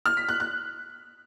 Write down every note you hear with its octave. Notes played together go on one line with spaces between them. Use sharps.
F6
B6
F#6
F#6